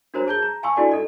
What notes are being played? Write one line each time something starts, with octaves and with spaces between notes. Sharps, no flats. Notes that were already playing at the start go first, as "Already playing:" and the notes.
D4 F#4 A#4 C5 C#5 A#5
G#4 A5 G6 G7
A#5
F5 G#5 A5 C6 C#6 E6
D4 E4 F#4 A4 D5 G#5
D#4 A4 D#5